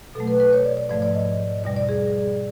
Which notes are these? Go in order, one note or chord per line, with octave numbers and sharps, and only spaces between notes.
B2 F#3 A3 A4
B4
B4
C#5
D5
D5
G#2 F3 A3 D5
D5
D#5
E2 B2 G3 D5
D5
G#4